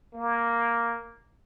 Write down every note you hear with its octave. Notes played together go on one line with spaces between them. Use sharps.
A#3